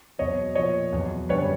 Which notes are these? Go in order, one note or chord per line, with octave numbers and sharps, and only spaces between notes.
E2 B2 F#3 C#5 D#5
A#2 F3 C#5 D#5
E2 B2 F#3
F#2 D3 G3 B4 C#5